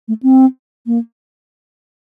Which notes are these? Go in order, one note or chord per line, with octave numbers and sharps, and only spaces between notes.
A3
C4
A#3